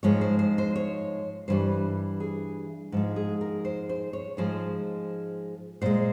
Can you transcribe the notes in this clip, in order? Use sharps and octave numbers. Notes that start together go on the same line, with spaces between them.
G#2 F3 G#3 C#5
C5
C5
C5
C#5
G2 E3 G3 C5
G#4
G#2 F3 G#3
G#4
A#4
C5
C5
C#5
G#2 F3 G#3 C5
A#2 G#3 C5